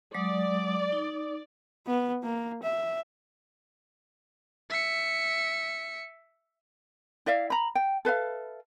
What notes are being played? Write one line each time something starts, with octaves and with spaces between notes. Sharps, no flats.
F#3 G#3 D5 D#6
D#4
B3
A#3
E5
E5 C#7
E4 D5 E5 F5
A#5 B5
G5
A4 B4 E5 F5